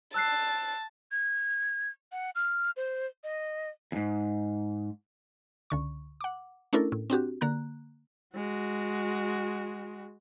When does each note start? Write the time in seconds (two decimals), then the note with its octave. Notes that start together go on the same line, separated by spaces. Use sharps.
0.14 A5 E6 F#6 C7
1.12 G#6
2.12 F#5
2.35 F6
2.77 C5
3.24 D#5
3.92 E2 G#2
5.70 C#2 D3 C#6
6.21 F#5 D6
6.73 A3 C#4 D4 E4 A4 A#4
6.92 A2
7.10 C4 D4 F#4 G4
7.41 D3 A#3 A#5 F#6
8.35 G#3 F#4